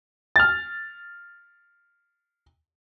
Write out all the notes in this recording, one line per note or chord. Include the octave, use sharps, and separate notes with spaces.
F6 A6